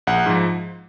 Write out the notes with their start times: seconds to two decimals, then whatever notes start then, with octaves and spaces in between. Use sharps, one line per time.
0.07 A#1 F#5
0.26 G#2 F3